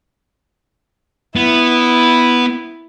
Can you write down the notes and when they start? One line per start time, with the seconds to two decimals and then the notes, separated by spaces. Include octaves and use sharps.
1.36 B3 E4